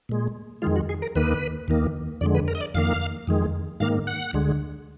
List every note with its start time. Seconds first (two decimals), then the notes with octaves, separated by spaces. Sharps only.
0.09 A#2 G#3
0.62 F2 D#3 G#3 F4
0.76 F#4
0.89 G#4
1.02 A#4
1.15 D#2 D#3 A#3 B4
1.68 D#2 D#3 A#3
2.21 F2 D3 G#3 D5
2.35 B4
2.48 A#4
2.55 D#5
2.61 D5
2.74 F2 D#3 A#3 F5
3.27 F2 D#3 G#3
3.80 G#2 D#3 A#3 F5
4.07 F#5
4.33 D2 D3 G#3